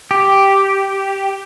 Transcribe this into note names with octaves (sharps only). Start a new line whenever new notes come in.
G4